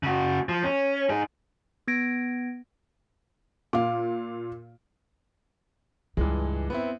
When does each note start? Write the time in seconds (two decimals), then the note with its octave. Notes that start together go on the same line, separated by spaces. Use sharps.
0.03 C#3 F#4
0.49 F3
0.64 C#4
1.10 D#4 G#4
1.88 B3 G#6 A#6 D7
3.73 A#2 F5 D6
6.17 C#2 G2 E3 G#3
6.70 B3 C4 E4